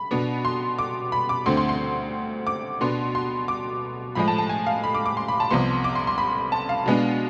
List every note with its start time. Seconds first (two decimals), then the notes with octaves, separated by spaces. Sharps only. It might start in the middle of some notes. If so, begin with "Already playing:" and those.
Already playing: B5
0.11 B2 B3 D4
0.45 C6
0.79 D6
1.12 B5
1.29 D6
1.46 D2 D3 A3 C4 C6
1.57 C6
1.69 C6
2.47 D6
2.81 B2 B3 D4 C6
3.15 C6
3.48 D6
4.15 A2 F3 G#3 B5
4.28 A5
4.38 A5
4.49 G#5
4.66 F5
4.84 B5
4.95 D6
5.06 D6
5.17 C6
5.28 B5
5.40 A5
5.51 C2 C3 F3 B3 C6
5.84 D6
5.95 C6
6.07 C6
6.18 B5
6.52 A5
6.69 F5
6.86 B2 G#3 B3 D4